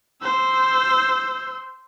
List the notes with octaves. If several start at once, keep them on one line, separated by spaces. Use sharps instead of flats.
C5 E6